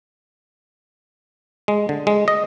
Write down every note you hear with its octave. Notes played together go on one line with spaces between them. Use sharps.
G#3
D3
G#3
D#5